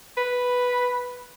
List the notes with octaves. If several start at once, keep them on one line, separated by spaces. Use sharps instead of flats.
B4